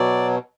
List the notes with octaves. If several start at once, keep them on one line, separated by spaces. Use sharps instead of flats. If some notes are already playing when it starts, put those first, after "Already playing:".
Already playing: B2 F#3 D5